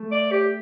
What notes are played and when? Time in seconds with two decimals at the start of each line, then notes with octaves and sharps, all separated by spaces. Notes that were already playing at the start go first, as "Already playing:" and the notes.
Already playing: A3 A4
0.12 D5
0.31 G4